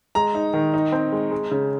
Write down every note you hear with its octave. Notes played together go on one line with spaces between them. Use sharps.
G#3 A#5
D#4
D#3
D#4
C4
G#3
G#3
C#3